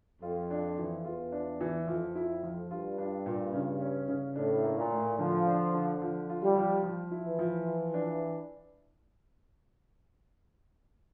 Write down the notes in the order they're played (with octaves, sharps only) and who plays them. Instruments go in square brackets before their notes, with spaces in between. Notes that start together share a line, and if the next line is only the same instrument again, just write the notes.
[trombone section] F2 [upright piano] F4
[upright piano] D4
E3
[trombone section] E2 [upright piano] F4
[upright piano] D4
E3
[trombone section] F2 [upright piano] F3
[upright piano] E4
F3
[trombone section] G2 [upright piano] F4
[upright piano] D4
A#2
C#3
C#4
C#3
[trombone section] A2 [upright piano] D4
[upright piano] A#3
[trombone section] A#2
[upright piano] A2
[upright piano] D3 [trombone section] F3
[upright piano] D4
D3
F3
F4
[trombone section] G3
[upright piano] F3
F3
E4
[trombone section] E3
[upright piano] F3
F4
D4